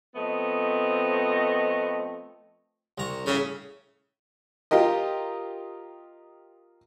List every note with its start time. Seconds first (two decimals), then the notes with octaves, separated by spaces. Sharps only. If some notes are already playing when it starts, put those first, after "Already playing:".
0.15 F3 A3 B3 C4 D#5
2.98 C2 A#5 C#6
3.26 A2 C#3 E5 F5
4.71 F4 G4 A#4 D#5